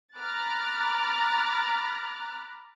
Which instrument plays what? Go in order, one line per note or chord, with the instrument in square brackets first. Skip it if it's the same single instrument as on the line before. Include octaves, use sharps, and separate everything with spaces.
[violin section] A#5 B5 D6 F6 F#6 A6